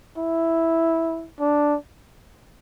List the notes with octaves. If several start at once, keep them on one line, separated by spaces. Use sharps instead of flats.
E4
D4